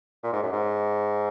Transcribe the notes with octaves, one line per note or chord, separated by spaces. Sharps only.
A#2
G#2
F#2
G#2